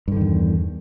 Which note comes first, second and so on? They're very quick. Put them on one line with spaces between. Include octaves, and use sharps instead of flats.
G2 D3 D#3 E2